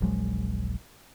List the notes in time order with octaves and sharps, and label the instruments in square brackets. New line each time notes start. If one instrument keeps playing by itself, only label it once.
[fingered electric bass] D#1 A#1 F#3 G#3